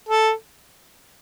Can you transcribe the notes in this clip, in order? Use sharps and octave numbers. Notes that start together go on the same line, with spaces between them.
A4